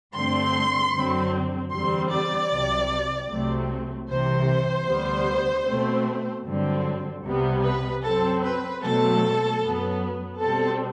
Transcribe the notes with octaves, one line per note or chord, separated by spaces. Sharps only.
G2 D3 A3 C4 C6
F#2 D3 F#3 C4
E2 D3 G3 C4 C6
D5
C2 C3 F#3
C2 C3 F#3 A3 C4
C2 C3 E3 C5
D2 D3 G3 B3
B2 A3 C4
G2 D3 F#3 C4
C2 C3 G3 B3
B4
F#2 F#3 C4 A4
B4
B2 F#3 A3 C4 A4
F#2 F#3 B3
B2 G3 C4 A4